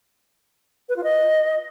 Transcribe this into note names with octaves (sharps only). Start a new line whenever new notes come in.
B4
F4
D#5